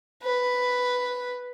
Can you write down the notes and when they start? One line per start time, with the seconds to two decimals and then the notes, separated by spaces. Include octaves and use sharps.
0.23 B4